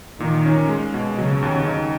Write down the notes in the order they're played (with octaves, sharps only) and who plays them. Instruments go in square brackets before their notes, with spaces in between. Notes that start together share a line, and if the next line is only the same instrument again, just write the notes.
[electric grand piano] A#2 [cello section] D#3
[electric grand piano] C#4
G#3
B2
[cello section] C#3 [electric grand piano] F#3
[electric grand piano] D#2
D#4